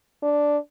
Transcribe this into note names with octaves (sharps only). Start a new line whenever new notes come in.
D4